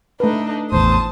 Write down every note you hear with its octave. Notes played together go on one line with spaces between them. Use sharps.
A3 D4 D#4 B4
A1 E2 A2 C5 A5 D#6